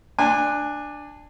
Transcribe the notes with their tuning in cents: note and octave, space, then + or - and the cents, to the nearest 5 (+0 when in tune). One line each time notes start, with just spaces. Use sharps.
D4 +10 G#5 -20